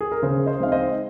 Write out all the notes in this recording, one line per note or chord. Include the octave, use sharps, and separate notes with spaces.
G#4
A#4
C#3 G#4 C5
C5 D#5
G#3 C4 D#4 F5
C5 D#5